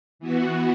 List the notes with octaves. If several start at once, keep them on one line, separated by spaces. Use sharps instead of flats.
E3 B3 F#4